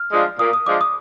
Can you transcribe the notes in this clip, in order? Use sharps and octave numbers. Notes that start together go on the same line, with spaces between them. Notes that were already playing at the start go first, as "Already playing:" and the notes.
Already playing: F6
F3 G#3 D4 F4
A#2 D#6
D#6
F3 G#3 D4 F4 D6
D#6